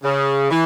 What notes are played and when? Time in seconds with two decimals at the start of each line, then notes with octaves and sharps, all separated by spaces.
0.04 C#3
0.51 E3